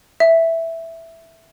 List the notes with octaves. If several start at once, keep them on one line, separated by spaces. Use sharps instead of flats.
E5